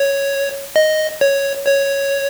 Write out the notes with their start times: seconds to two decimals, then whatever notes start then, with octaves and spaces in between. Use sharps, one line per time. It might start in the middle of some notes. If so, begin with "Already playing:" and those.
Already playing: C#5
0.76 D#5
1.21 C#5
1.66 C#5